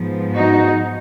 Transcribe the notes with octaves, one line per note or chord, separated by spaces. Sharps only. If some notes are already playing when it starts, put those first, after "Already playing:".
Already playing: G#2 F3 B3
D#4 F#4